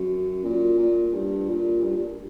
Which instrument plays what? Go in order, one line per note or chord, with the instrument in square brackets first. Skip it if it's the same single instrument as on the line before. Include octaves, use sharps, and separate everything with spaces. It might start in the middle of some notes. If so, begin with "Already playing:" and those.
Already playing: [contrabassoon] F#2
A#2
A#2
G2
A#2
G2
A#2